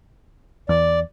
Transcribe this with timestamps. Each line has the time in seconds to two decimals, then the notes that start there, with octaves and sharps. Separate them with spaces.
0.69 E2 D5